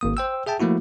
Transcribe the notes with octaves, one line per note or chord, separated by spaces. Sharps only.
G#1 A#3 D#6
C5 G5 E6
G#4 E5 G5 A5
F3 A3 A#3 E4 F#4